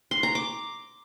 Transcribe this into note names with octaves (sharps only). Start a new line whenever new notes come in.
C6
A#5
D6